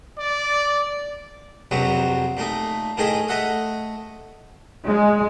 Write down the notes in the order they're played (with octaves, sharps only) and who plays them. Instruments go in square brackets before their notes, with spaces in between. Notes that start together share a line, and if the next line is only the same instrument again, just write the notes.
[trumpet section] D5
[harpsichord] A#1 F2 C3 F#3 B3 C#6
A#2 A3 D#4
A2 D#3 A3 G#4 D#5 G#5
A3 D#5 E5 F#5 D#6
[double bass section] G#3